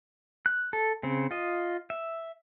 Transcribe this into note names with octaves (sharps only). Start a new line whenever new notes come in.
F#6
A4
C#3 C4
F4 D#5
E5